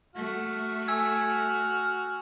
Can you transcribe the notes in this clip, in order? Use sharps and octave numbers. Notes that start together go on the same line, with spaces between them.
A3 F#4 F6
G#5 E6 G#6